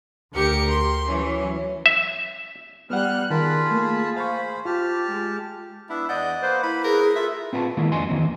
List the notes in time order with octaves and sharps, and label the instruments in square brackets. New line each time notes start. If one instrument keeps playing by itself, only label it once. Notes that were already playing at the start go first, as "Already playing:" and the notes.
[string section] D2 G4 A#4 C#7
C6
E3 F#3 C#4
[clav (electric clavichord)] E5
[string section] G3 F#6 [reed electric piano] B3 F#5 [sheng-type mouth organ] F6
[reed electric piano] D#3 A#4 [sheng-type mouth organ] F4 A5 B5 [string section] G#4
[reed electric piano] A3 A#3
[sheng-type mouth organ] C5 B5 [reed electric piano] F5 C#6
[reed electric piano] F4 [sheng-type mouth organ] G4 A5 F6
[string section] G#3
[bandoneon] B3 D4 E5 [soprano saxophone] E4
[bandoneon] E2 D#5 G6 [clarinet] D5 [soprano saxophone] F#5
[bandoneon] A#3 B4 [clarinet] C5
[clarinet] E4 [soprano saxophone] B5
[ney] G#4 [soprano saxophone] A#4
[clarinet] F4 [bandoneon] A4 [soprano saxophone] E5
[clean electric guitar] C4 F4 B4 G5 A5
D#3 G#3 A#3 B3 E4
F2 D4 F#4 D#5 G#5 C6
D#2 D#3 E3 A#3 C4